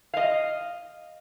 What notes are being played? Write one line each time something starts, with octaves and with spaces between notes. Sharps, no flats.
D#5 F5